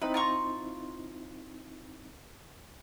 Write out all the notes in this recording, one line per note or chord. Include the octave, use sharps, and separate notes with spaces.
C4 D#4 E4 B4
F4 A#5 C#6